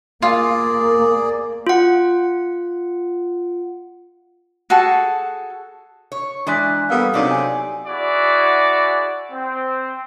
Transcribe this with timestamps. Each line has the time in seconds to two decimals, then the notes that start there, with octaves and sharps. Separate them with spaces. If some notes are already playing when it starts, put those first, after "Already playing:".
0.22 A#3 F4 G#4 D5
1.67 F4 F#5
4.70 F#4 G#4 A4 A5
6.12 C#5
6.47 E3 G#3 D4 D5 A#5 C6 F#6 B6
6.90 G3 A#3 B3 A4 F5 D#6 E6
7.14 C3 F#3 C4 D#4 D5
7.31 G#5
7.86 E4 F#4 G#4 D5
9.31 C4